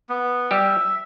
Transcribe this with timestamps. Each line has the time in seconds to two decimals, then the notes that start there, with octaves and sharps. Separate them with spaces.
0.09 B3
0.51 G3 G4 E5